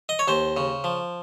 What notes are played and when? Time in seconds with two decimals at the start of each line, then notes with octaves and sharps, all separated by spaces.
0.09 D#5
0.19 C#5
0.28 D#2 C5
0.57 C#3
0.84 F3